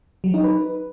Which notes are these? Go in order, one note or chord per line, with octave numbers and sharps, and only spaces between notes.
F#3
D#4
B4